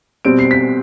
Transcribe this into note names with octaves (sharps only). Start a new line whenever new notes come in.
B2 G3 C4 D7
C7
B6